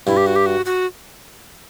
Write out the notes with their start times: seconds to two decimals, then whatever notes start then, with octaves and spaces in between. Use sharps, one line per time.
0.07 G2 E4
0.17 G4
0.26 F#4
0.36 G4
0.46 F#4
0.65 F#4